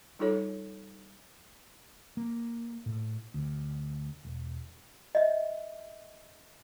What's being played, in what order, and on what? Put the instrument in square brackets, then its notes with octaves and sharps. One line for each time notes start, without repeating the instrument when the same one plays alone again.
[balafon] G3 D#4 F4 A4 C#5
[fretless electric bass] A#3
A2
D2
E1
[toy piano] D#5 E5